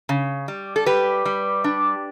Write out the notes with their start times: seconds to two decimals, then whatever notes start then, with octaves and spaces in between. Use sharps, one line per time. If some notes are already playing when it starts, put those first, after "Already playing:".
0.09 C#3
0.48 G3
0.76 A4
0.86 G3 G4 B4
1.25 G3
1.64 D4